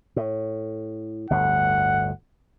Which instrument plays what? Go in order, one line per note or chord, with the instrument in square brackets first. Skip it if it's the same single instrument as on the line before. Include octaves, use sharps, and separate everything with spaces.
[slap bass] A2
[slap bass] G1 D2 A2 [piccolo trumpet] F#5